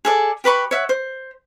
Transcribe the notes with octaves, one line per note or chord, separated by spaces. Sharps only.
G#4 A4 D5
G4 B4 B5 C#6
C#5 E5 F#5
C5